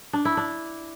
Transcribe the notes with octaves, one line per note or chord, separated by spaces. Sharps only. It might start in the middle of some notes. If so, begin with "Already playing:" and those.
D4
E4
D4